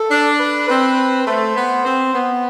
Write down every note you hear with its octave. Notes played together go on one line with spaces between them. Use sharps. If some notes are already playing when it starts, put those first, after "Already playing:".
Already playing: A4
D4
B4
C4 B4
A3 C5
B3
C4
B3